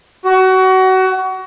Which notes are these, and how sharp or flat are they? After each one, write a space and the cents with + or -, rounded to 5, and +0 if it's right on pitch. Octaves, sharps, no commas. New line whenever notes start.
F#4 +25